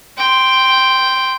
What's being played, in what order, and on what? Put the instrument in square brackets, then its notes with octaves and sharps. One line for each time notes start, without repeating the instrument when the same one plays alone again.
[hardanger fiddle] G5 C6